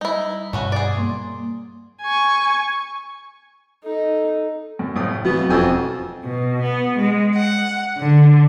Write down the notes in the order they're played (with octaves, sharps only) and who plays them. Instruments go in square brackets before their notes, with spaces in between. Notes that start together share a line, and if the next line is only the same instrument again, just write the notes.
[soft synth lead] G3 [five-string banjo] D#4 E4
[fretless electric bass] G2 B2 [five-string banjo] A3 C#4 F#4
[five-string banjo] G#4 D5
[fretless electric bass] A#3 [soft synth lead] C6
[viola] G#5 C#6
[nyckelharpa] D#4 [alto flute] A4
[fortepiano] F#2
C2 A2 D#6
[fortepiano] E3 [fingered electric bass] F#3 C4 [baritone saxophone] B3 [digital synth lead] F#4
[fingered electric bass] E1 C#4 [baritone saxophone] F2 [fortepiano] G5 G#5 E6
[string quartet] B2
B3
G#3
F#5
D3